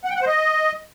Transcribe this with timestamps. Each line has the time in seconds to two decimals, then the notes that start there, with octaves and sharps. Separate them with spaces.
0.04 F#5
0.10 G5
0.16 F#5
0.21 C5
0.27 D#5